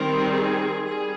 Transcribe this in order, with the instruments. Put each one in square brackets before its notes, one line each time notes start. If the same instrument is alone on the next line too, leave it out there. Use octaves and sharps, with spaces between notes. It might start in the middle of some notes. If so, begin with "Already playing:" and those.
Already playing: [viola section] D#3 G3 C4 A#4
G#4
G3 G#4